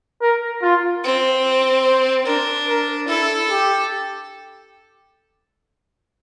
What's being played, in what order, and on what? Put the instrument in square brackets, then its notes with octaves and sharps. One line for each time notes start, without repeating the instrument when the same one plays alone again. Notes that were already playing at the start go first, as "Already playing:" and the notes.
[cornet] A#4
F4
[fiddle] C4
[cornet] C5
[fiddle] D4 [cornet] A#4
[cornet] A#4
[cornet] E4 [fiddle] A4
[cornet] G4